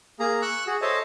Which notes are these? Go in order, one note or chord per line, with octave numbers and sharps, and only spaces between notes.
A#3 G#4 A#5
C#6 E6 F#6
F#4 G#4
A4 C5 C#5 D#5 E5 A5